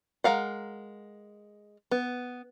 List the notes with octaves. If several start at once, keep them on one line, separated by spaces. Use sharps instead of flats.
G#3 A#4 F5 F#5
B3